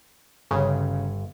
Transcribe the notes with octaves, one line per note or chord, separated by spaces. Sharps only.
G1 C#3